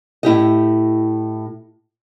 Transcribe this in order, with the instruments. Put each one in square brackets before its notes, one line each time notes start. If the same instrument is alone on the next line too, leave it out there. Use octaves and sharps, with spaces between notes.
[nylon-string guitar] A2 E4 G4 D#5